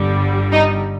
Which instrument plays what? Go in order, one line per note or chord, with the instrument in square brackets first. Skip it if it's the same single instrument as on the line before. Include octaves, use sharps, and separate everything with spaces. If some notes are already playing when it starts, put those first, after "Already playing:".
Already playing: [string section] G1 G2 D3 G3
D#4